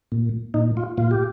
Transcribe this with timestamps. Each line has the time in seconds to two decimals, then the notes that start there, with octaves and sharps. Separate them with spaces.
0.12 A#2
0.54 A#2 D#4
0.77 F4
0.98 A#2 F4
1.11 G4